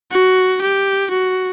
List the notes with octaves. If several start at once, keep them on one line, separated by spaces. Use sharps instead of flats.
F#4
G4
F#4